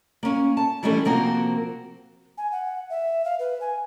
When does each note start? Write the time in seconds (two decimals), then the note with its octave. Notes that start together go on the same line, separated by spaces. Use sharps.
0.23 A#3 C#4
0.57 A5
0.83 D#3 E3 G3 A3 C#4 E4
1.05 C3 F3 A#3 C4 F#4 A#4
2.38 G#5
2.52 F#5
2.90 E5
3.25 F5
3.39 B4
3.61 G#5